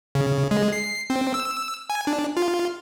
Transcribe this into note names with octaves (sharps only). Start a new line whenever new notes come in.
C#3
G#3
C7
C4
E6
G#5
D4
F4